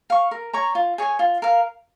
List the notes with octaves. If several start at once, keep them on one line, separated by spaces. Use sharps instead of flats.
F5 C#6
A#4
C#5 A#5 C#6
F4
G#4 C#5 G#5
F4
A#4 F5